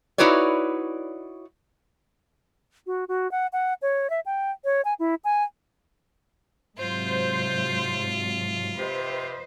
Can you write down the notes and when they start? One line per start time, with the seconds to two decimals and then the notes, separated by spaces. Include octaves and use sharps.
0.18 D#4 E4 F#4 B4 C#5 D5
2.87 F#4
3.08 F#4
3.31 F#5
3.53 F#5
3.82 C#5
4.10 E5
4.26 G5
4.64 C#5
4.85 G#5
4.99 E4
5.24 G#5
6.79 G#2 C3 F#3 F4 C5
8.77 C3 B4 C5 D#5